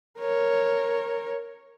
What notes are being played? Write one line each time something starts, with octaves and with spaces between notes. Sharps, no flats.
A#4 C#5